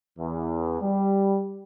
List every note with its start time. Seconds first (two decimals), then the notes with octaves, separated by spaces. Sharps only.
0.19 E2
0.82 G3